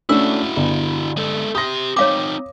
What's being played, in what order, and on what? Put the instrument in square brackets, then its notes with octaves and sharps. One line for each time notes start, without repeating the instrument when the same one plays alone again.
[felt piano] A3 C#4 D4 [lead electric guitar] E4 F#4 [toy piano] E6
[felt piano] G1
[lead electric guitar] G#3 A4
[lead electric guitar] G4 C6 [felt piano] D#6 A#6
[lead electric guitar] C4 D#4 [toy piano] C#5 F5 D6